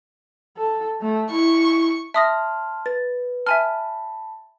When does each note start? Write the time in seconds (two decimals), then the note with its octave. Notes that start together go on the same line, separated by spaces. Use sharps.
0.57 A4
1.01 A3
1.30 E4 C#6
2.14 E5 A5 C6 D#6 F6 A#6
2.86 B4 A6
3.47 E5 G#5 A5 B5 F6